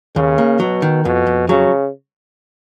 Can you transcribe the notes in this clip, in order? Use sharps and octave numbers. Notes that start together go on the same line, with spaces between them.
D#2 C#3
A#3
B2 F#3
D#3
F2 B2
F2
C#3 F#3